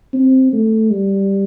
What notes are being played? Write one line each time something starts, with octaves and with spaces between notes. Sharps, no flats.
C4
A3
G3